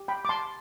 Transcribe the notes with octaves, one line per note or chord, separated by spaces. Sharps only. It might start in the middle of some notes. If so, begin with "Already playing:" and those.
Already playing: G4
G5 B5
D6
A5 C6